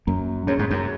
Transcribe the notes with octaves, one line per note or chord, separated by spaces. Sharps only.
F#2 A#3
F#2 C#4 G#4 C#5
G#2
F#2